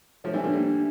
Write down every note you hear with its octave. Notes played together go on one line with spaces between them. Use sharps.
F3 A3 C#5
E3 G3
F3 A3 D4
G3 A#3
D4